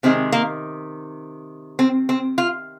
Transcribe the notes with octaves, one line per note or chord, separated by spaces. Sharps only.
C3 D#3 G#3 C4
A#3
C4
C4
F4